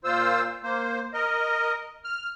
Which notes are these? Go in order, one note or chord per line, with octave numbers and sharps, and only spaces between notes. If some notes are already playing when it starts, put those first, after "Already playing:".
A#2 F4 C5 E6
A#3 C5
A#4 D#5
F6